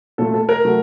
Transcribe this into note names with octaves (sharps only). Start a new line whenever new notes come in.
A#2 A3 A4
A4
A#4
F#3 A3